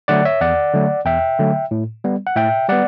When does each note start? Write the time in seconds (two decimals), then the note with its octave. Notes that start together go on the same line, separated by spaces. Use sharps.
0.08 D3 F#3 A3 D5 F#5
0.25 C#5 E5
0.41 E2 D5 F#5
0.73 D3 F#3 A3
1.06 E2 E5 G5
1.39 D3 F#3 A3
1.71 A2
2.04 G3 B3
2.26 F#5
2.36 A2 E5 G5
2.69 G3 B3 D5 F#5